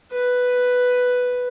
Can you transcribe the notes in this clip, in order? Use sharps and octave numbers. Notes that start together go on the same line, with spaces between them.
B4